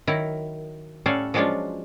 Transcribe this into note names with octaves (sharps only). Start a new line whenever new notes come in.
D#3 F#3 E4 A#4
A2 G3 C#4 A4 F5 F#5
F3 F#3 G#3 C#4 D4 F4